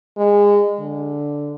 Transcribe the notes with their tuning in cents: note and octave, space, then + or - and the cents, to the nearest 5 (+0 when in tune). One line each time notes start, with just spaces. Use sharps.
G#3 -25
D3 -5